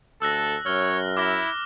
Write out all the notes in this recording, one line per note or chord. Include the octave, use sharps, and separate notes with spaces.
D2 A4 E6 F#6 A#6
F#2 C#5 F6
E4 D6 F6 A#6